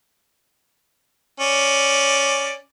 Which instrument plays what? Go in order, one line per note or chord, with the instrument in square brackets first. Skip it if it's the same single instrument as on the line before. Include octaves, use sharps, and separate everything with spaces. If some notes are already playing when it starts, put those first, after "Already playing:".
[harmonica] C#4 D5